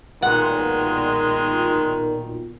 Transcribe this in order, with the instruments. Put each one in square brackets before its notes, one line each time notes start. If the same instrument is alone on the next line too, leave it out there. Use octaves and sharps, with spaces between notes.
[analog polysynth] B1 A#2 [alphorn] D#3 [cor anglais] G#3 [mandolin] F#5